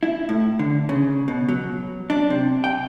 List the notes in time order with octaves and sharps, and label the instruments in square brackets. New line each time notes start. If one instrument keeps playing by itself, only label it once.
[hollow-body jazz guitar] E4
A2
D3
C#3
B2
F#3
D4
C3
G5